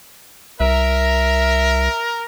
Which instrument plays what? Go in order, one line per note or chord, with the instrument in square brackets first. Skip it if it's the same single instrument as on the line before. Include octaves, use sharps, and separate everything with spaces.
[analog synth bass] C2 [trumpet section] A#4 [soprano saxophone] E5